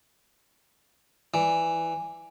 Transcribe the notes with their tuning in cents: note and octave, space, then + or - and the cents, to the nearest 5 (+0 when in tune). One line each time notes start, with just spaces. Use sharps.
E3 +0 D5 +0